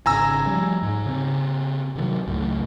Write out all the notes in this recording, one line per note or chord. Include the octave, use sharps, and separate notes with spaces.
G#1 C#3 G#5 A#5 E6
F3 G3
G#2
C#3 C4
C3 D#3 F#3
C#2 F#2 A2